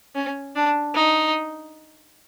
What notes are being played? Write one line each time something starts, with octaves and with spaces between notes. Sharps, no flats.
C#4
D4
D#4